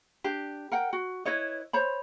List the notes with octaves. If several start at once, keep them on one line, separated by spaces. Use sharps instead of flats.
D4 G4
A#4 F#5 G5
F#4
E4 B4 C#5 D#5
C5 C#5 B5